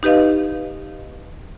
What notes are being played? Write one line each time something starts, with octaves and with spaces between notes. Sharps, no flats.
D#4 G4 B4 D#5 F5